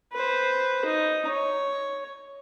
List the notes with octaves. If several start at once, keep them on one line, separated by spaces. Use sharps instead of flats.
B4 C5
D#4
C#5